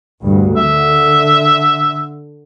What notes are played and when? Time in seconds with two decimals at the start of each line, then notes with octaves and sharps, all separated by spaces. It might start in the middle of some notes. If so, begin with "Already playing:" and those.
0.21 D2 G2
0.57 D3 E5